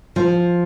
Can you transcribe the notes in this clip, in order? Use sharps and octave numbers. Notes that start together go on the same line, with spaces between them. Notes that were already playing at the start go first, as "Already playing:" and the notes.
F3